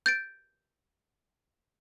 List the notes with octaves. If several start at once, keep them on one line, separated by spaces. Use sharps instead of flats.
G6 A6 D7